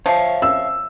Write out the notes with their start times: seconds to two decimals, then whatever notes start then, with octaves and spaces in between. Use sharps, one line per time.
0.06 F3 C#5 E5 F5
0.42 E6